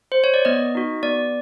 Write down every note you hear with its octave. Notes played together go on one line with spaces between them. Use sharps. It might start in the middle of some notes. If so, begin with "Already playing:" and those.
C5
C#5
D5
B3 D#5
D#4 F#4
B3 D5